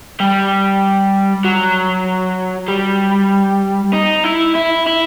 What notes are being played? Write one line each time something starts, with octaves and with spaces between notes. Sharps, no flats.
G3
F#3
G3
D#4
E4
E4
E4